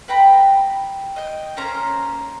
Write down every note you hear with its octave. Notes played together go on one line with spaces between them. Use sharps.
B4 G5 A#5 B5
D#5 G5
A#3 C#4 C5 A#5